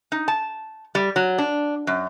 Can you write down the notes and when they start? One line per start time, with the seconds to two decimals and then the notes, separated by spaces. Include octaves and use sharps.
0.12 D#4
0.28 A5
0.95 G3
1.16 F#3
1.38 D4
1.87 F#2